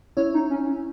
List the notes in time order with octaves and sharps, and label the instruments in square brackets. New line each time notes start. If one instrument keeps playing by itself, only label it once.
[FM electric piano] C#4 E4 [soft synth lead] C#5
[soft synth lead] D#4
C#4